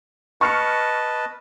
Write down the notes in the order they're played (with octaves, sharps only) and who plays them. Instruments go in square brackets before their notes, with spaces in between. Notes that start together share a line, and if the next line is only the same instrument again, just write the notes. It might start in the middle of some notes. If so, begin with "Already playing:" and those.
[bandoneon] B4 D#5 A5 [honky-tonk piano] C#6 F6 C#7